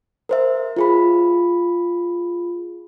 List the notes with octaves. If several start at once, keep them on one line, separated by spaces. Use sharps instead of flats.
A#4 C5 E5
F4 G#4 B5